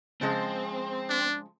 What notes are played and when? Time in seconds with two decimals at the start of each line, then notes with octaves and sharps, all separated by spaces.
0.21 C#3 F3 G#3 C4
1.09 D4